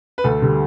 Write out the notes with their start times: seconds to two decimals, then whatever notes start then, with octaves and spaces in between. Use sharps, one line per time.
0.18 B4
0.24 D2 A4
0.42 D3 G3